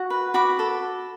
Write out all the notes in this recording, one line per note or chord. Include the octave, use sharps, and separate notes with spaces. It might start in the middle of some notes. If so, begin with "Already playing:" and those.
Already playing: F#4
B4
F#4 B5 D6
A4